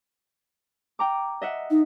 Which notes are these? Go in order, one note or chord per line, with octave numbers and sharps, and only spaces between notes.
G5 A#5 D6
D#5 E5 F#5
D#4